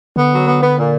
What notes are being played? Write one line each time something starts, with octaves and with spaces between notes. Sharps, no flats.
D3 B3
F#3
B3
B3
A#2